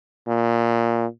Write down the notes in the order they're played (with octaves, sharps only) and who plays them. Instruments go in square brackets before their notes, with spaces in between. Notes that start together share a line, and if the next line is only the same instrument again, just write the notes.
[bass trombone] A#2